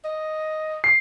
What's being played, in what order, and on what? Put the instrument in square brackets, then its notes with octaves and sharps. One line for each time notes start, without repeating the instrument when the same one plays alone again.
[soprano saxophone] D#5
[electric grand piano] C7